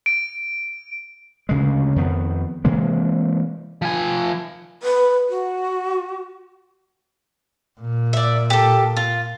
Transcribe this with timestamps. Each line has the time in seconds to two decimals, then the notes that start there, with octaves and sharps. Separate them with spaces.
0.06 D7
1.49 D2 C#3 G#3
1.96 F2 D#3 B3
2.65 C3 E3 G#3 A#3
3.82 F3 G#5
4.83 B4
5.30 F#4
7.80 A#2
8.13 D5 E5
8.50 G4 A4
8.97 F4